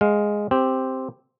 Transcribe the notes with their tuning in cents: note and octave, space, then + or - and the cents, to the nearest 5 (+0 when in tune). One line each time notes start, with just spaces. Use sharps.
G#3 +0 F5 +25
C4 +0 G4 +0